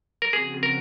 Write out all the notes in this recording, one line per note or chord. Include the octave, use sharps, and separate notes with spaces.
A#4
C#3 F3 C4 F#4 G#4
A#4